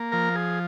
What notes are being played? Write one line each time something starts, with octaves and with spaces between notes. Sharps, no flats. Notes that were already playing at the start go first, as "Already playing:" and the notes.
Already playing: A#3
F3 A#4
G#4